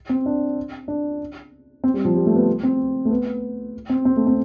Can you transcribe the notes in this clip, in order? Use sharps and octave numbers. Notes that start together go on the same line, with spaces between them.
C4
D4
D4
C4
G3
F3
G3
A3
B3
C4
A3
B3
C4
C4
A3
C4